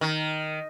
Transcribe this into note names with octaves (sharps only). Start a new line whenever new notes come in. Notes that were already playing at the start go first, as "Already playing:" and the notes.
D#3